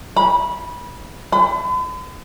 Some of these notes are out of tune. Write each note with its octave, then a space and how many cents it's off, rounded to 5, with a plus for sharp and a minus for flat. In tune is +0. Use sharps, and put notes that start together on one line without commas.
B5 -20
B5 +45